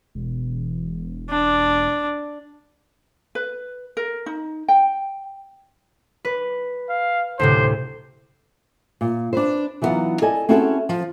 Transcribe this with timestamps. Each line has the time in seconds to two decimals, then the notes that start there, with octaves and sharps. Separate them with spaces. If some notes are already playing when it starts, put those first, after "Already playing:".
0.15 E1
1.30 D4
3.35 B4
3.97 A#4
4.26 D#4
4.68 G5
6.25 B4
6.89 F5
7.39 D2 A2 C3 C5
9.01 A#2
9.33 D4 B4 C5
9.82 E3 F#3 A3 B3 D#4 F4
10.22 A4 D5 D#5 G#5
10.49 C4 C#4 E4 F#4 G#4 A4
10.89 F3